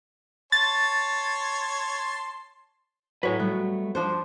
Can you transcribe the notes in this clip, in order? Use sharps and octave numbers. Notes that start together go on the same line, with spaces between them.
C#5 A5 C6 A6
A2 F#3 B4 C#5 G#5
G3 A3 B3
F3 D4 C5